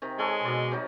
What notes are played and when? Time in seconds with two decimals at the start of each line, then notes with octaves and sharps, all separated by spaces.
0.02 C3 D#3
0.19 G#3 G#4 A4 C#5
0.44 B2 A#4 D5 C6
0.71 C3 F#3 D#4